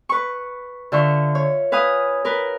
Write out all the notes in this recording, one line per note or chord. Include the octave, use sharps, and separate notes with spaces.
B4 C#6
D3 F4 E5 C#6
C#5
B4 F5 G#5 D#6
A#4 B4